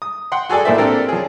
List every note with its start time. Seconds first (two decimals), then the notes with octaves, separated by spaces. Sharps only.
0.02 D#6
0.32 F#5 G5 C6
0.49 F#4 G#4 A4 D5 G#5
0.65 A#1 A2 A#3 D4 C5 E5
0.78 C4 D4 G4 A4 A#4
1.09 F3 C#4 G#4